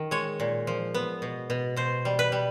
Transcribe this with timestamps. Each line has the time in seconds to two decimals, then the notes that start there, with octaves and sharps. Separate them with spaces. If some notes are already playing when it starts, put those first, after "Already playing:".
Already playing: D#3
0.11 G#3 C#5
0.40 A#2
0.67 F3
0.94 B3
1.22 B2
1.50 B2
1.76 B2 C5
2.05 G3
2.19 B4
2.32 G3